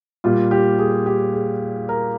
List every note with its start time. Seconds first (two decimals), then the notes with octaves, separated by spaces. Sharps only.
0.24 A#2 G3 F4
0.51 G4
0.79 G#4
1.06 G4
1.34 G#4
1.89 A#4